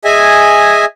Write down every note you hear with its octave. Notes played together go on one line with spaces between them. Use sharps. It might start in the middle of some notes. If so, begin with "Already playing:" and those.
G#4 D#5 E5 G#5